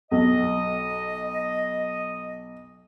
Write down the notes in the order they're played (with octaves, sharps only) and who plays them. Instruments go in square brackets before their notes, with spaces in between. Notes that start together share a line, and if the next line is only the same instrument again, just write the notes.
[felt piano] B1 [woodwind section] D#5